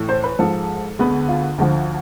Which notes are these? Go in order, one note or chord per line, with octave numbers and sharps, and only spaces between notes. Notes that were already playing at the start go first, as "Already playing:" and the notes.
Already playing: A2 E3 A3
C5
B4
G#2 F3 G#3 A4
D2 D3 G#3 B3
F4
D2 D3 F3